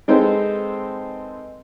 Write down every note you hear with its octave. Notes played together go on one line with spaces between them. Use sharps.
G#3 C4 D#4 A4 B4 C5